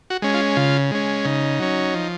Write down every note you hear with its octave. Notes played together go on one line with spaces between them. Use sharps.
F#4
G#3 C#4
F4
C#3 F4
G#3 C#4
C#3 D#4
F#3 C#4
F3